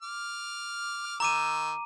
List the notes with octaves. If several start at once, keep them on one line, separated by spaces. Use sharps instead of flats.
D6 F6
D#3 A#5 D6 E6 D#7